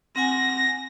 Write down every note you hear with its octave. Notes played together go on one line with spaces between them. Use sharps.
C4 F#5 G#5 A#6